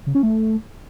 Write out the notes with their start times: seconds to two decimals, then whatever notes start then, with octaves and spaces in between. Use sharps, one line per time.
0.07 C#3
0.15 C#4
0.23 A3